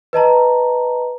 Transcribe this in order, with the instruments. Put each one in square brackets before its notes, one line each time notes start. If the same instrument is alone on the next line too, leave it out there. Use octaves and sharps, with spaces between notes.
[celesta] B4 D#5 A5 A#5